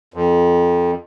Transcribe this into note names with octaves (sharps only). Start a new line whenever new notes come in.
F2